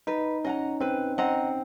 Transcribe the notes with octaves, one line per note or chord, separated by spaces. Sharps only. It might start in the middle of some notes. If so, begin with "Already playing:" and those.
D#4 B4
C#4 D#5 F#5 A#5
C4 B4
C4 D#5 F#5 A#5